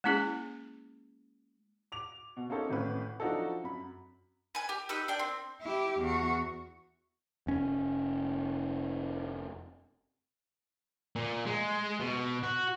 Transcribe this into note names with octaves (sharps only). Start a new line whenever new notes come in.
G#3 A#3 C#4 E4 G#4
D6 F7
B2
A#3 C4 C#4 D#4 A4 C5
G#1 A2 C#4 B4
F3 F#3 D4 D#4 F#4 A4
F#2 B5
B4 G#5
G4
D#4 G4 B4 E6
D4 G5
C4
E4 G4
E2 F#4
F1 C#4
A#2
G#3
B2
F#4